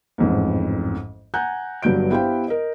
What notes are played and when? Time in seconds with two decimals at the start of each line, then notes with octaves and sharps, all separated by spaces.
0.18 A1 F2 G#2
1.34 F#5 G#5 A#5 F#6 G6
1.82 G1 G2 F#3 G6 D7
2.10 B3 E4 G4 C5 F5 G5
2.48 A#4 D#5